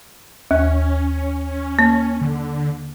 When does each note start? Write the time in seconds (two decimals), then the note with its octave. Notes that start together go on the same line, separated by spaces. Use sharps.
0.51 D#2 C#4
1.79 A#3
2.21 D3